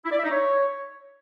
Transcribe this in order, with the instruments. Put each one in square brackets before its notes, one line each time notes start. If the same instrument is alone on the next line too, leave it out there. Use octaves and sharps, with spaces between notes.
[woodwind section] E4
D5
E5
D#4
C#5